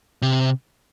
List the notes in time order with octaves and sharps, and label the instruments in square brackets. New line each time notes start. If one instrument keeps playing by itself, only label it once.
[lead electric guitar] C3